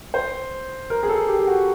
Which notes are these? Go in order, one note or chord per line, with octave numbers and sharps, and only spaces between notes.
C5
A#4
G#4
A4
G4
G4
F#4